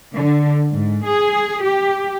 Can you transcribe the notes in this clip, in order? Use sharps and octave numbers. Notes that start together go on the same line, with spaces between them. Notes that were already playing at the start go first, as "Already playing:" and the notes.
D3
G#2
G#4
G4